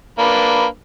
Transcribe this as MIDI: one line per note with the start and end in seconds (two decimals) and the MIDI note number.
0.19 0.65 58
0.19 0.65 62
0.19 0.65 71